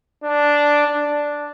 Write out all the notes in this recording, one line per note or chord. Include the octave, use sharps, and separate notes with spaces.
D4
D4